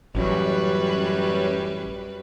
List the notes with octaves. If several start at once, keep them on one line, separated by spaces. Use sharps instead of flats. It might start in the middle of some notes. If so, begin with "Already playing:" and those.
A1 F#2 F#3 G3 B4